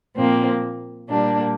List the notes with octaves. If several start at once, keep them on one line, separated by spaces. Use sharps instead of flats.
A#2 F3 A#3 C4
A#2 G3 A#3 D4